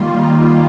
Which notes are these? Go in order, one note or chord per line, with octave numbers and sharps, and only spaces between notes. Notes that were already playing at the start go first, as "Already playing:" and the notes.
Already playing: D#3 G3 A#3 F4